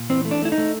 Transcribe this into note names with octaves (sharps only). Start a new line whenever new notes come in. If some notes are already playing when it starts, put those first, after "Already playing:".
Already playing: A#2
E3 C4
A3
D4
A3 E4
D#4
A3